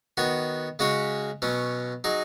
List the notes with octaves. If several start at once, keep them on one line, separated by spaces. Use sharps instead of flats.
D#3 B3 F#4 C#5
C#3 G#3 C#4 F#4 C#5
B2 F#3 C#4
F#3 D#4 G#4